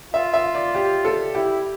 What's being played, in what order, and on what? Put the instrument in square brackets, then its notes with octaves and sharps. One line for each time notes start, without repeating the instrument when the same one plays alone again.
[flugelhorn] F4 [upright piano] E5
[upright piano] E5
D5
G4
A4
[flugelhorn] E4 [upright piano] G4